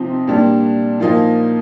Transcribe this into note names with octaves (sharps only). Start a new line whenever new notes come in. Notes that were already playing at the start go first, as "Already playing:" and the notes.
Already playing: C3 F3 C4 D#4
A#2 G3 D4
A#2 F3 A#3 D#4